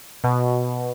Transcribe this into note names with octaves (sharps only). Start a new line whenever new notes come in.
B2